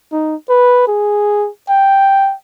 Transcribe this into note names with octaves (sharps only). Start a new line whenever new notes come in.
D#4
B4
G#4
G5